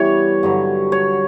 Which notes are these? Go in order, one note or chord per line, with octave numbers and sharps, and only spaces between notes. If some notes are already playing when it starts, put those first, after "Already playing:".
Already playing: E3 G3 B3 C#5
G2 D3 F#3
C#5